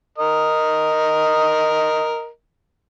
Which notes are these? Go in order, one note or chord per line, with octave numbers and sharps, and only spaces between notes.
A#4 D#5